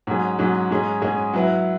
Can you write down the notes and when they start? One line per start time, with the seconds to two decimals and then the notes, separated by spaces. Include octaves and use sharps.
0.07 G#2 F#3 C#4 G#4
0.39 G#2 F#3 C#4 G#4
0.71 G#2 G#3 C#4 G#4
1.02 G#2 G#3 C#4 G#4
1.33 F#3 E4 B4